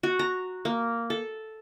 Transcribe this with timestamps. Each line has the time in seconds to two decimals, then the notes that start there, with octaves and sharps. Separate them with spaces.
0.03 F#4
0.19 A#5
0.65 A#3
1.10 A4